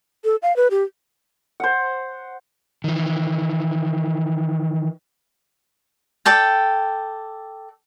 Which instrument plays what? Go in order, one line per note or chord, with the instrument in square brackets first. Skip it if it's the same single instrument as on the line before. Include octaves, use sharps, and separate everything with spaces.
[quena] A4
F5
B4
G4
[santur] C5 F#5
[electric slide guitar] D#3 E3
[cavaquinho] A4 D5 G5